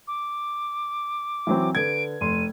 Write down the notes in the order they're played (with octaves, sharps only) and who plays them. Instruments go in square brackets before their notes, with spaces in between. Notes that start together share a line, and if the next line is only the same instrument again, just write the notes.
[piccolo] D6
[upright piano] E3 F#3 C4
[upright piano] D3 B4 G#6 [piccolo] D7
[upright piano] F1 C6 [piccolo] D#7